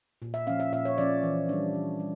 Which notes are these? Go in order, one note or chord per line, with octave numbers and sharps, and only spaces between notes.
A#2
E5
F3 C#4 F5
E5
A#2 E5
C#5
F3 C#4 D5
E3
G3 D4
E3
G3